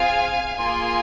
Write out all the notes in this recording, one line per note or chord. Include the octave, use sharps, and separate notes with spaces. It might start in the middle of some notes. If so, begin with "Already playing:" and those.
Already playing: C4 F4 G#4 F5 G#5
A#3 F4 G#4 G#5 C6